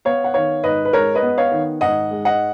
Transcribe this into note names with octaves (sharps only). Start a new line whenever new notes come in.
B3 C#5 F5
F#5
D#3 C#5 F5
G#2 B4 D#5
B4
G#3 A#4 C#5
B4 D#5
B3
C#5 F5
D#3
G#2 D#5 F#5
G#3
D#5 F#5